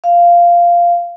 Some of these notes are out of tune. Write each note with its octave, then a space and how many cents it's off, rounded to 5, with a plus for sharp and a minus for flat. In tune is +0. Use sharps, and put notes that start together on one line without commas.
F5 -10